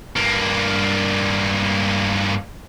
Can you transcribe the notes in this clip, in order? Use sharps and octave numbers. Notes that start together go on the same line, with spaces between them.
G2 A#3